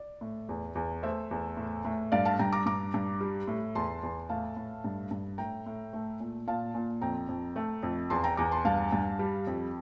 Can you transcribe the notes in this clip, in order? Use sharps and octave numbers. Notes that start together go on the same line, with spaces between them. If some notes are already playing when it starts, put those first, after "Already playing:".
Already playing: D5
A2
E2
E2
A3 C5 E5
E2
A2
A2
G2 D5 F5
F5 A5
G2 G5 A#5
A#5 D6
G2 A#5 D6
G2
G3
A2
E2 A5 C6
E2
A2 F5 A5
A2
G2
G2
A2 G5 A#5
A2
A3
A#2
A#2 F5 A5
A#2
F2 G5 A#5
F2
A3
F2
E2 A5 C6
G5 A#5
E2 A#5 D6
A5 C6
G2 F5 A5
G2
G3
F2